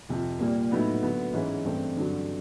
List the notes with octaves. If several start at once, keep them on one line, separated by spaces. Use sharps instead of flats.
F2 C3 F3
A#2 G3 A#3
A2 F#3 B3 D#4
D3 F#3 B3
G#2 E3 G#3 C#4
G2 E3 A3 C4
G2 D3 F#3